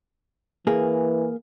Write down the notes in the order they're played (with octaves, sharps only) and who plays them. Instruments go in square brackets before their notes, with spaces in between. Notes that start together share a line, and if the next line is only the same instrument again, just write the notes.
[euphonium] E3 [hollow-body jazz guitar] A#3 G#4